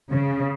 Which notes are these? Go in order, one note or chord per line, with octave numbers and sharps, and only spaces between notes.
C#3